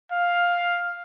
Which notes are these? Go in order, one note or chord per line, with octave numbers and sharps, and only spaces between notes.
F5